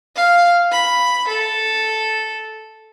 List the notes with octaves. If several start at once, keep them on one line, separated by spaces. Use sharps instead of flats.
F5
B5
A4